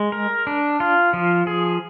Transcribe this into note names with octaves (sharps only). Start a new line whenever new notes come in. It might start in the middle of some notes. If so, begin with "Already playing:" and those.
Already playing: G#3
A#4
D4
F4
F3
G#4